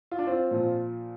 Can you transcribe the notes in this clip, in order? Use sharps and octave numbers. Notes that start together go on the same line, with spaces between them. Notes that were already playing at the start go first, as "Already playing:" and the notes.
F4
D4
C4 F4
A#2 F3